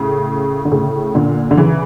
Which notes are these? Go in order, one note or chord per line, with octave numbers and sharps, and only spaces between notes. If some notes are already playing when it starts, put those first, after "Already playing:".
Already playing: A2 C#3
D3
A2 C#3
A#2 D3
D3
C#3 E3